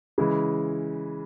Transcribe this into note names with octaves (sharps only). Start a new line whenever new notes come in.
C#3 E3 G#3